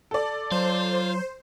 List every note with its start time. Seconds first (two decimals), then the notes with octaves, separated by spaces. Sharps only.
0.11 A4 D5
0.52 F#3 F4 C5